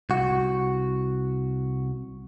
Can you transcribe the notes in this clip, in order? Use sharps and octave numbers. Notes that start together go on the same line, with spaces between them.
C2 F#4